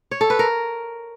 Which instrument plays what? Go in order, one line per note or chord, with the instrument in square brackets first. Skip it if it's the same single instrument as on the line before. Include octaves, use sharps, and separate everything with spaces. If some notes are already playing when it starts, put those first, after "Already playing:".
[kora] C#5
A4
B4
A#4